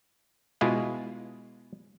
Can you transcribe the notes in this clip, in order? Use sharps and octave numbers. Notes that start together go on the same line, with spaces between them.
B2 G#3 E4 F4 G#4